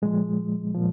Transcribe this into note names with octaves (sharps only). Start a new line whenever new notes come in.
A#2 F3 G#3
A#2 F3